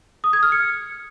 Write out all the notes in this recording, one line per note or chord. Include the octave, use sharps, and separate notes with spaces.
D#6
G#6
F6
C#7